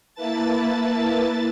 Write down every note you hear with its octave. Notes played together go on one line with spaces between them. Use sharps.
A#3 E4 B4 A5 A6